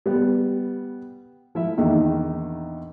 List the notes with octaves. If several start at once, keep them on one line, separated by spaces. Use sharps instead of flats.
G3 B3
F3 E4 E5
A#1 E2 D#3 D#4